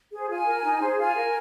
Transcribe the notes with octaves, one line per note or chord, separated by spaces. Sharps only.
G#4 C5
F4 G#5
A#4
D#4
G#4 C5
F4 G#5
A#4